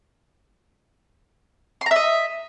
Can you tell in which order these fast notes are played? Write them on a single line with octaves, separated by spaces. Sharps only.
C6 A#5 E5 D#5